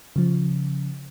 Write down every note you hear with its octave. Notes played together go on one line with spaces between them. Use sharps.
C#3 F3